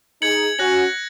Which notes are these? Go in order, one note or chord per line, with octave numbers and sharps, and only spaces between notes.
D#4 G#4 G#6 C#7 F#7
C#4 F#4 F#6 A#6 F#7